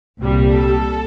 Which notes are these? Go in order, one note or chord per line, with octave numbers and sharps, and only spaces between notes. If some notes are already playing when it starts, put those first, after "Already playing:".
C2 A#2 G3
A4